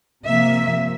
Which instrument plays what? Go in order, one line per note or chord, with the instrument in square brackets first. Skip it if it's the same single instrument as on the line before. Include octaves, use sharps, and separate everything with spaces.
[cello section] C3 F3 A#3 E5